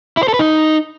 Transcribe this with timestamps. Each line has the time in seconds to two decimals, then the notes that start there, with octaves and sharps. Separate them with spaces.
0.17 E4
0.23 C5
0.28 A4
0.34 B4
0.39 D#4